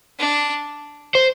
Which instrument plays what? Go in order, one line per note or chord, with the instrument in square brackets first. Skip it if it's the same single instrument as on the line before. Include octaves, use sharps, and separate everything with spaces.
[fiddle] D4
[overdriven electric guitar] C5